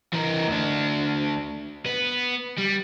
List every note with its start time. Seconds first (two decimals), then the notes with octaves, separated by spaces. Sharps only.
0.14 E3 A#4
0.48 D2 D4
1.86 B3
2.58 G3